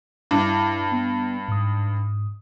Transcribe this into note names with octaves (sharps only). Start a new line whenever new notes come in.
G2 E4 D6
B3
G#2 D#6